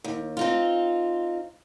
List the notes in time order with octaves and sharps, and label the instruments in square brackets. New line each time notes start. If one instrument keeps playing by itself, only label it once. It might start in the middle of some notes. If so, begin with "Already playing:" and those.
[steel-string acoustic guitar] D#2
C4 D#4 F4